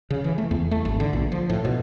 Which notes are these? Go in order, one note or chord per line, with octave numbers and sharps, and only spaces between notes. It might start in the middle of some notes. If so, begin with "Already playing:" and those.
C#3
E3
A3
E2
A3
G#1
D3
A#1
F3
A2
B2